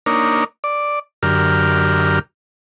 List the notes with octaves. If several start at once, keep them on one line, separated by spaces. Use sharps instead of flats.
A#3 D4 D#4 A#4 C#5
D5
F#2 D3 G4 A#4 F6